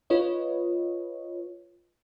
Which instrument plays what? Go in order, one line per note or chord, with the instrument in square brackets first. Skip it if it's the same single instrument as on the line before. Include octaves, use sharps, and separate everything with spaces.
[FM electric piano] F4 B4 C#5 D#5